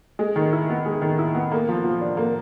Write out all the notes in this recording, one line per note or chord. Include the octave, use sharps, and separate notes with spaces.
G#3
D#3
E4
B3
G#3
D#3
E4
B3
A#3
F3
F3
D4
A#3